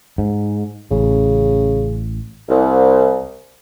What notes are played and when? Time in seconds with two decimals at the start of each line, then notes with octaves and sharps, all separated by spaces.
0.18 G#2
0.91 A1 C#3
2.48 C2